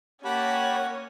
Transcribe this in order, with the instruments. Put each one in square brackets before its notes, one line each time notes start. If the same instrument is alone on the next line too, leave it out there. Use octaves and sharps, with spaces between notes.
[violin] A#3 C#5 [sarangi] C#4 [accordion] G4 A5 B5 [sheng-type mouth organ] F#5